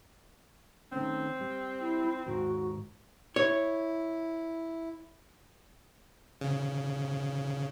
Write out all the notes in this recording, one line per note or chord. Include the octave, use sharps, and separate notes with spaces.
D#3 A3 C4 C#4
G3
E4
D#2 G#2 F#4 A#4
E4 C#5
C#3